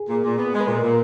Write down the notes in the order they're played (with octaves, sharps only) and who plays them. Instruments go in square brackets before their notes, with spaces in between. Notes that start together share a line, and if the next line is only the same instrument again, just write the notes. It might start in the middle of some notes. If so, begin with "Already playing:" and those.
Already playing: [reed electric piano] G#4
[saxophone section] A#2
A#2
B3
G#3
[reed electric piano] B4
[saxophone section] A#2 [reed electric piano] A#4
[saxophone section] A#2